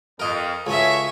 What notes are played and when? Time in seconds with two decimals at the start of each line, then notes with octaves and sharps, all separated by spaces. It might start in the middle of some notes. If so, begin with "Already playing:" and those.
0.20 F2 A#4 D#5
0.67 C#2 F#4 A4 C#5 E5 G#5